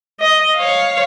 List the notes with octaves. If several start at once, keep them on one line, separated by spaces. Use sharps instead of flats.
D#5
C#5 F5